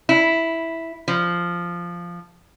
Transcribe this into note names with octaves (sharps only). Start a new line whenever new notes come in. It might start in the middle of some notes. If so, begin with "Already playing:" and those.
E4
F3